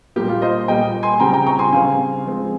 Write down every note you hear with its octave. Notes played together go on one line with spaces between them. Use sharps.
A#2 G3 A#3 G4
F4
C5 D#5
A#2 G3 A#3 D#5 G5
G#5 C6
C#3 G3 C4 G5 A#5
G5 A#5
A#5 C#6
G#5 C6
C#3 G3 C4 F5 G#5
F3 G#3 C4